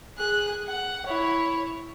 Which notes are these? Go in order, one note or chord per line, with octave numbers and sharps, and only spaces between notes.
G#4 F#6
F#5
E4 C#5